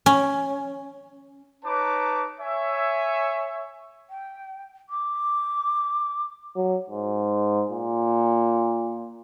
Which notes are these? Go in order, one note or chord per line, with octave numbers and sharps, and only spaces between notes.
C#4
D#4 B4 C#5 A5 A#5 D6
C#5 E5 G#5
G5
D6
F#3
G#2
A#2